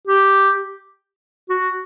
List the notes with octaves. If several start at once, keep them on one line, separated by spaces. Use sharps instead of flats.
G4
F#4